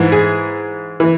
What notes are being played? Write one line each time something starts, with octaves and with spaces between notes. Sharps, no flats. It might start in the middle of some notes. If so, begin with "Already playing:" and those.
Already playing: G#2 E3
G#4
E3